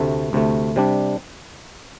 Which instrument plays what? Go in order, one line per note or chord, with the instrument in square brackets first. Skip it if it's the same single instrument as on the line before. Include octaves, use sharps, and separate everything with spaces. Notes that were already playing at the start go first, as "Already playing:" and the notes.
Already playing: [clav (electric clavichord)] D2 C3 A3
D2 C3 A3
C3 G3 D4